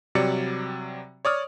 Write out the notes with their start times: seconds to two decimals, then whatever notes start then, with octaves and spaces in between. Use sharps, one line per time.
0.15 C3 F#3 G3 D5 C#7
1.25 C#5 D5 D#6 F6